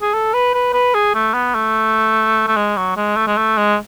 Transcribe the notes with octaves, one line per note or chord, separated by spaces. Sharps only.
G#4
A4
B4
B4
B4
G#4
A3
B3
A3
A3
G#3
F#3
G#3
A3
G#3
A3
G#3